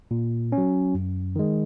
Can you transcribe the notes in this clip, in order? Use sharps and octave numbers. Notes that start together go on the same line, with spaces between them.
A#2
C#4
F#3
F#2
D#3 G#3